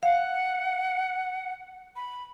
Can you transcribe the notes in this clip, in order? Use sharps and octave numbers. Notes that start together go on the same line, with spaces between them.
F5 F#5
B5